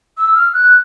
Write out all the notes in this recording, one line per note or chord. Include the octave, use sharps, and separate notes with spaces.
E6
F6
F#6